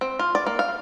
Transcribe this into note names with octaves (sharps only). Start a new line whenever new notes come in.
C4
F4
D5
A#3
F5